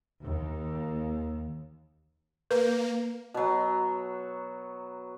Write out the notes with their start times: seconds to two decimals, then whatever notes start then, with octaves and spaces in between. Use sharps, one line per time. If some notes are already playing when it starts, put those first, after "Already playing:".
0.22 D#2
2.51 A#3 B4
3.34 B2 F#3